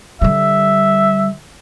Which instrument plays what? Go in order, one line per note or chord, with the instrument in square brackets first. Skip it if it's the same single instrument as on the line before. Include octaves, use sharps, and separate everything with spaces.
[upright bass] D3 G3 [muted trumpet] E5